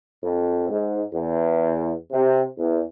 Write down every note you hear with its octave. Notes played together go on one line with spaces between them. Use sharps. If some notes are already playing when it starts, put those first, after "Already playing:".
F2
G#2
E2
C3
E2